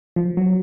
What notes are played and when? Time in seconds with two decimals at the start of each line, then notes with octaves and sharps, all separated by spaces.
0.16 F3
0.37 F#3